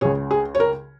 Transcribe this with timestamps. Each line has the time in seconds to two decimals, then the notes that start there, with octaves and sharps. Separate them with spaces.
0.01 C#2 C#3 G#4 C#5
0.31 G#4
0.55 C#5
0.60 A#4